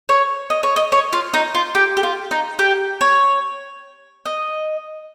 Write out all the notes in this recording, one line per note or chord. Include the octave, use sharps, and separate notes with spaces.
C#5
D#5
C#5
D#5
C#5
F4
D#4
F4
G4
G4
F4
D#4
G4
C#5
D#5